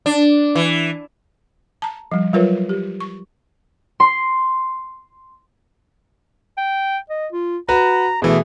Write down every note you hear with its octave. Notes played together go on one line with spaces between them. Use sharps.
D4
E3
A5 A#5
F3 G3
F#3 G3 F4 A#4 B4 C#5
G4
C#6
C6
G5
D#5
F4
F#4 B4 A#5
B2 E3 A3 G#4